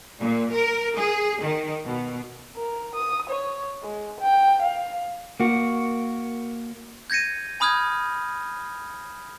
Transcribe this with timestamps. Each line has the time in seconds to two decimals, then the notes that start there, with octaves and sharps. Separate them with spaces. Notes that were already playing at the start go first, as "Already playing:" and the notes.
0.19 A#2
0.51 A#4
0.96 G#4
1.42 D#3
1.84 B2
2.56 A#4
2.95 D#6
3.29 C#5
3.82 G#3
4.21 G5
4.62 F5
5.40 A#3 F#4
7.10 G6 G#6 A#6 C#7 D#7
7.60 G#5 B5 D#6 F6 G6 G#6